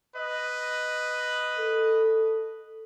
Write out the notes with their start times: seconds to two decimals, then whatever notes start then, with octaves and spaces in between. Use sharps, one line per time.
0.16 B4 D#5
1.59 A4